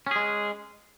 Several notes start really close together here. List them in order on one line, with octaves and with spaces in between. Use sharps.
C#4 G#4 G#3